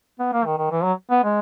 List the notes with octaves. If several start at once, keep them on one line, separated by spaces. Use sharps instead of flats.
B3
A#3
D#3
D#3
E3
F#3
B3
G#3